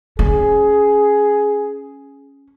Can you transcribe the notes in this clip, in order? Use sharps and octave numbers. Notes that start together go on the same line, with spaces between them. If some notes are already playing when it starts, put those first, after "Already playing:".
C#4 G#4